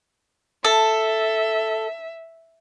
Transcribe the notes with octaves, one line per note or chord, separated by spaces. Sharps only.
A4 E5